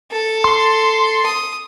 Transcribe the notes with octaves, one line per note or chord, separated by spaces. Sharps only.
A4
C6
D#6